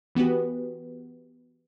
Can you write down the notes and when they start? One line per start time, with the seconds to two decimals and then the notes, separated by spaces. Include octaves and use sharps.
0.15 E3 B3 F#4 G4 B4